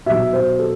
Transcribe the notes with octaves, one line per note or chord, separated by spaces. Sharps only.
B2 F#3 E5
C5
A4